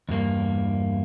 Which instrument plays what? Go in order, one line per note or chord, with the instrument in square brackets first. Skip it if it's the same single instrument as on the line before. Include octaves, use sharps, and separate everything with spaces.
[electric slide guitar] E2 G2 A#3